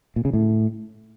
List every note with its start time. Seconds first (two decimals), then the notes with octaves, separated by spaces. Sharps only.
0.16 A#2
0.25 C#3
0.33 A2